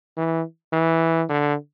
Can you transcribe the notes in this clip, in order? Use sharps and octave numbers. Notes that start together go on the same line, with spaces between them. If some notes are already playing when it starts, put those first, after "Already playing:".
E3
E3
D3